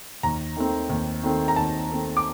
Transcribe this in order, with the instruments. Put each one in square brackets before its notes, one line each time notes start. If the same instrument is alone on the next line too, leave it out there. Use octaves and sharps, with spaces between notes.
[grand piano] D#2 A#5
D#3 A3 C4
D#2
D#3 A3 C4
A#5
D#2 A5
D#3 A3 C4
D6